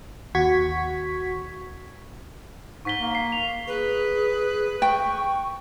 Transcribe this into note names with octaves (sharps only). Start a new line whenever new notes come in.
D#2 F#4 C#6 G#6 B6
G#2 C#6 B6 G7
A#3
C7
F7
G#4 B4
G5 C#6